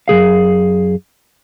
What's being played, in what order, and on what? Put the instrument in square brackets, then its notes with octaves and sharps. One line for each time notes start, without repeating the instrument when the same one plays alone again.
[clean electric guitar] F#2 E3 G#4 F5